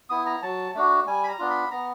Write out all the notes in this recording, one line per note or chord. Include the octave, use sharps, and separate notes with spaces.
B3 E4 D#6
A#5
F#3 A5
A3 D4 F#4
G3 G#5
B5
A#5
B3 D4 F4
B5
B3 A#5